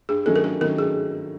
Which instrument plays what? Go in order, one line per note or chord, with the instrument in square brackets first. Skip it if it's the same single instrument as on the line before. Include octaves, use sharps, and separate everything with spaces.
[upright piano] G2 [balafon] G#4
[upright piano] D#3 F#3 A3 C#4 [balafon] A4
[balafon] A#4
[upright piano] G2 [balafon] A4
[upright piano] D#3 F#3 A3 C#4 [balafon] A#4
[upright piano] G2 [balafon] G#4